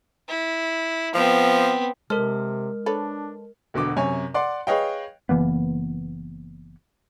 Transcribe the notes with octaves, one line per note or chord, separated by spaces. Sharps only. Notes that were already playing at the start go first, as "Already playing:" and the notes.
E4
F3 B3 C4
C3 G#3 A4 A#4 C5 F6
D4 A4 B4 C#5
E1 B2 D3 D6
F#2 C3 C#5 G#5
D5 F#5 C6 D6
G#4 B4 C#5 D#5 F5 G5
F#1 E3 A#3 B3